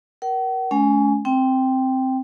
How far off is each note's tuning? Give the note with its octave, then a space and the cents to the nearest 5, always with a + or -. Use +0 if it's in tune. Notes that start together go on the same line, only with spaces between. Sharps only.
A#4 +20 F#5 +45
A3 -45 C#4 +30 G#5 +0
C4 +0 G5 +0